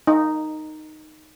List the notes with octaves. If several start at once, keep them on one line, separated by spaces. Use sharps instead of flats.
D#4